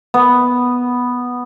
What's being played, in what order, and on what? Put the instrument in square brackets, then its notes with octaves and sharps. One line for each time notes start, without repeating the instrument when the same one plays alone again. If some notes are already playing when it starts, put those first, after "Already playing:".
[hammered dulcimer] B3